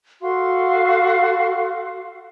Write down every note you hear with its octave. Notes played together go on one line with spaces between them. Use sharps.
F#4 A4 F5 C6